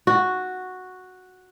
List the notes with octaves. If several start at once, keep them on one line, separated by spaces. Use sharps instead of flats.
F#4